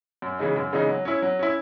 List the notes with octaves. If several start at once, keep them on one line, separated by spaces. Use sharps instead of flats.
F#2
C#3 E3 G#3 D#4
F#2
C#3 E3 G#3 D#4
F#3
C#4 E4
F#3
C#4 E4